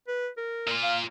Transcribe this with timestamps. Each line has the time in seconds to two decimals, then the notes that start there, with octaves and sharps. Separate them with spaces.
0.08 B4
0.37 A#4
0.67 A#2 F4
0.83 F5